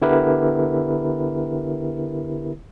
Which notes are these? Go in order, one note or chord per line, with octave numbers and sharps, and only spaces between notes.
D3 B3 E4 G4 A#4 B4